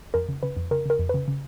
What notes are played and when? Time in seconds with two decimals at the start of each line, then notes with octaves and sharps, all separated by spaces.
0.14 F2 A#4
0.28 C#3
0.43 C#3 B4
0.57 F2
0.71 C#3 A#4
0.86 C#3 A#4
0.99 F2
1.09 C#3 B4
1.28 C#3